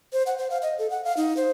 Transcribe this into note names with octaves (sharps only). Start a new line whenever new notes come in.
C5
F#5
C5
F5
D#5
A4
F#5
F5
D#4
C5